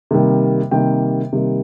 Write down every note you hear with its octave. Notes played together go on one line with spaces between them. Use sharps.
C3 D#3 G3 A#3
C3 D#3 G3 A#3 G5
C3 D#3 G3 A#3